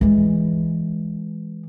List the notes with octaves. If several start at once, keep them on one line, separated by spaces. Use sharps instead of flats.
E3 G#3